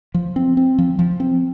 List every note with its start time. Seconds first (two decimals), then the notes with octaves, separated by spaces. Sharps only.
0.14 F3
0.36 C4
0.57 C4
0.78 F3
0.99 F3
1.20 C4